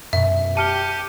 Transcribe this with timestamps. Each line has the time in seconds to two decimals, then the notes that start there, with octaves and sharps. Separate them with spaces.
0.13 F#2 B2 E5
0.57 G4 A5 F6 C#7 D#7 G7